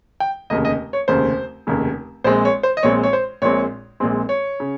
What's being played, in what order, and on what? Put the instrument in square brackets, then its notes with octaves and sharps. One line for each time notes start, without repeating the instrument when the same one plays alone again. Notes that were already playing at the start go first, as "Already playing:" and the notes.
[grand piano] G5
F1 D#2 C#3 D#5
D#5
C#5
F1 D#2 C#3 C5
F1 D#2 C#3
A#1 A#2 G#3 C4 C5
C#5
C5
D#5
A#1 A#2 G#3 C4 C#5
C#5
C5
A#1 A#2 G#3 C4 C#5
A#1 A#2 G#3 C4
C#5
C#3